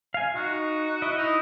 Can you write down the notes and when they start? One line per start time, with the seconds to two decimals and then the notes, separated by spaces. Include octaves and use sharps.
0.14 F5 G#5
0.35 D#4 F#4
1.02 E4 D#5
1.18 D#4